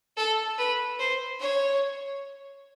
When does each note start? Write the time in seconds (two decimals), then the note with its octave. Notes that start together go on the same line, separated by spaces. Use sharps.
0.17 A4
0.58 B4
0.99 C5
1.40 C#5